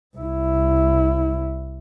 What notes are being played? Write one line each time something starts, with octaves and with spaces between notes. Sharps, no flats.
C2 E4